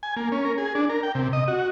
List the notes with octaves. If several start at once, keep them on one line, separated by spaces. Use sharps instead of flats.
G#5
A#3
C#4
A#4
G#4
D4
A#4
G5
C3
D#5
F#4